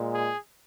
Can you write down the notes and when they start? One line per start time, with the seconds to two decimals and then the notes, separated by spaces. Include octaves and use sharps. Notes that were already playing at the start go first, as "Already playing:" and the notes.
Already playing: A#2 G#3
0.13 G#4